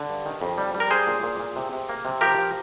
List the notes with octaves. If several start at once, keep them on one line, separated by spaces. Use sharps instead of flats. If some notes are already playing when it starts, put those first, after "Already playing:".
Already playing: D3
G2
D#3
F2
G3
G3
A#4
D4 G#4 C5
A#2
A#2
A#2
C3
C3
A#3
C3
F3 G4 A#4
F3